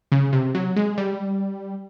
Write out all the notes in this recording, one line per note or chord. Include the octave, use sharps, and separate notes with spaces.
C#3
C3
F#3
G#3
G3